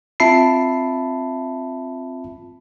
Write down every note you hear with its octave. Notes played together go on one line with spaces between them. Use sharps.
C4 F4 E5 A5 B5 C7